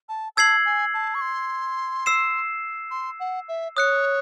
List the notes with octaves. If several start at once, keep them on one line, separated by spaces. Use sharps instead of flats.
A5
A5 E6 G#6 C7 F#7
G#5
A5
C#6
C6
E6 C7 E7
C6
F#5
E5
C#5 D#6 F#6 C#7